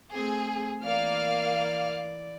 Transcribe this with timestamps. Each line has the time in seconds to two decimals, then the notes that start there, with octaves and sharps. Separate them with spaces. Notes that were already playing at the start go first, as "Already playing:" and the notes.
0.14 A3 C4 G#4
0.84 E3 A#3 D5 F5 F6